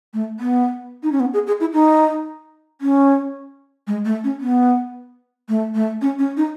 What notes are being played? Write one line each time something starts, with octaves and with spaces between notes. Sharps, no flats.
A3
B3
D#4
C#4
B3
G#4
G#4
E4
D#4
C#4
G#3
A3
C#4
B3
A3
A3
C#4
C#4
D#4